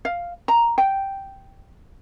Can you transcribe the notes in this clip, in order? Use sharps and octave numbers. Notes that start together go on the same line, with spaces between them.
F5
A#5
G5